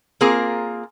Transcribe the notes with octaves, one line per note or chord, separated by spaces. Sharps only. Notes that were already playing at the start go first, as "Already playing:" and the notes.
A#3 C4 F4 G#4 A#4